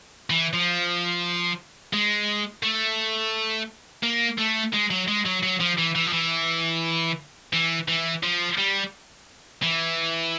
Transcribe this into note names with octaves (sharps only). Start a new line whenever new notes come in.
E3
F3
G#3
A3
A#3
A3
G#3
F#3
G#3
F#3
F#3
F3
E3
E3
F3
E3
E3
E3
F3
G3
E3